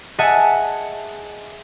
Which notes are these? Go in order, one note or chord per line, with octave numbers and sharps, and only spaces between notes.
G#4 D#5 E5 F#5 G#5 A5